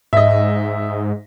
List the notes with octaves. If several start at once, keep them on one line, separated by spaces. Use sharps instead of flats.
G#2 D#5 E5